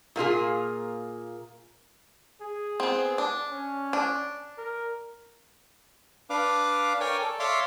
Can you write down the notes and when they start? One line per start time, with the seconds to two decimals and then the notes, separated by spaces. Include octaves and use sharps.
0.16 A#2 A#3 F4 G#4
2.41 G#4
2.80 B3 C4
3.18 D4
3.51 C#4
3.93 D4
4.58 A#4
6.30 D4 B4 F5 D6
7.00 A#4 C#5 D5 G5 G#5
7.21 A4
7.39 C#5 D5 E5 F5 C6 D6